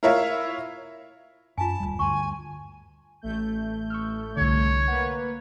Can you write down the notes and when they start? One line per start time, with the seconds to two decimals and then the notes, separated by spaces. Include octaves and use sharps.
0.03 E4 F4 A#4 C#5 E5 F5
1.58 F#2 F4 G#5 A5
1.80 D1 C#2 G3
1.99 D2 G2 G#5 C6 C#6
3.22 A1 A3 G6
3.90 C#6 E6 F6
4.37 C2 D3 C#5
4.88 A#3 B4 F#5